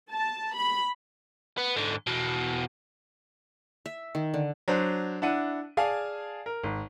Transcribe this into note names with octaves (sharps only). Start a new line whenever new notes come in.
A5
B5
B3
G#2 D3
E2 B2
E5
D#3
D3
F#3 D4 C5
D4 E4 F#5 D#7
G#4 D5 F5 G#5 A5
A#4
G#1